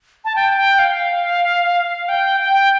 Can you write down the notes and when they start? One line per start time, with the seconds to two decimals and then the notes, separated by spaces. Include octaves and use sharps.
0.25 A5
0.36 G5
0.57 G5
0.79 F5
2.09 G5
2.40 G5